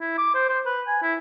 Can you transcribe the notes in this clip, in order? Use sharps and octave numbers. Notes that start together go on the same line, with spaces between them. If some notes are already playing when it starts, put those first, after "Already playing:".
E4
D6
C5
C5
B4
G#5
E4